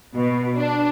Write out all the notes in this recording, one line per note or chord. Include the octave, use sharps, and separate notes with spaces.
B2
D4